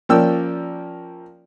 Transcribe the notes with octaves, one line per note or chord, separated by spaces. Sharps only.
F3 A#3 C#4 D5 G5 E6